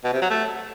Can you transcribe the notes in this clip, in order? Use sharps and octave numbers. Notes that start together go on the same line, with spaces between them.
B2
C3
F#3
A3